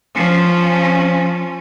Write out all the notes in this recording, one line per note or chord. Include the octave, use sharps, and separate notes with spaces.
F3 C#4